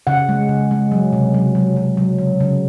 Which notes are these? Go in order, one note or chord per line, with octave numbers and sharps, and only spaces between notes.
C#3 F#5
G#3
C#3
G#3
F#3
C3
F#3
F#3
F#3
F#3
C#3
C#3